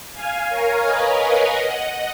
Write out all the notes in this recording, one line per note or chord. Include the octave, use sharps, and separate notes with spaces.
F5 G#5
A#4 C#5
B4 D#5
C#5 F5
D#5 F#5